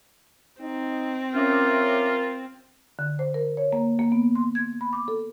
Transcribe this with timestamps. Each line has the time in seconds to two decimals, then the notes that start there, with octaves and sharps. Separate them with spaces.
0.61 C4 D#4
1.35 C#4 F4 A#4 E5 D6
2.99 D3
3.19 C5
3.34 A#4
3.57 C#5
3.73 A#3
3.99 A#3
4.12 B3
4.35 C6
4.55 G#6
4.81 B5
4.93 D6
5.08 A4